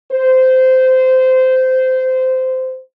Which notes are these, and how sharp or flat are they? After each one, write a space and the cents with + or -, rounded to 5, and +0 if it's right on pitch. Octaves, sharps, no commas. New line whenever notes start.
C5 -15